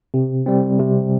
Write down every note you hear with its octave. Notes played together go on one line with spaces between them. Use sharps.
C3
G3 C4
C3